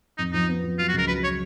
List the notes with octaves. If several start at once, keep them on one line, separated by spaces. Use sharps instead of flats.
F2 D#4
F3 D#4
B3
F3
F#3 F4
F#4
C#2 A#4
F#3 B4
C#5